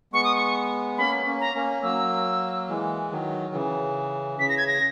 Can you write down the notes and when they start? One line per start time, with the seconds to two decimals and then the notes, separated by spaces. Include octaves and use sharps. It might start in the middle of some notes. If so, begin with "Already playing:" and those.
0.13 G#3 B3 C#6
0.24 D#6
0.36 C#6
0.98 A#3 C#4 B5
1.26 A#3 C#4
1.40 A#5
1.55 A#3 C#4
1.83 F#3 A#3 E6
2.69 E3 G#3
3.11 D#3 F#3
3.54 C#3 E3
4.39 C#3 B6
4.49 A#6
4.58 G#6
4.67 A#6